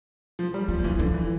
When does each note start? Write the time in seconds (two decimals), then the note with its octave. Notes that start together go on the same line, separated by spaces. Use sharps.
0.39 F3
0.54 G3
0.68 F3 A#3
0.79 F3
0.84 E3 A#3
0.99 D3 F3
1.14 E3